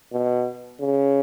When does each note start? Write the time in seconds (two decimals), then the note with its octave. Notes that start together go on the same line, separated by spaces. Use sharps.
0.13 B2
0.81 C#3